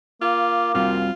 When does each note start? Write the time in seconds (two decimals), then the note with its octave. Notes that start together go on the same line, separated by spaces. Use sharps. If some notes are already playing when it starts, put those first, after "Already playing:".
0.22 A#3 F4 D6
0.74 G3 C4 F4 F#4